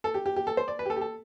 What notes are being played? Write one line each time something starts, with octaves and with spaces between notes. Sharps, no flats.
A4
G4
G4
G4
A4
C5
D5
B4
G4
A4
G4
A4